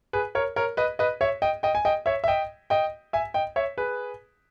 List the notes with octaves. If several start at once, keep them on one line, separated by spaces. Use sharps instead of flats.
G#4 B4
A#4 C#5
A#4 C#5
B4 D#5
B4 D#5
C#5 E5
D#5 G5
D#5 G5
G#5
D#5 G5
C#5 E5
E5
D#5 G5
D#5 G5
E5 G#5
D#5 G5
C#5 E5
G#4 B4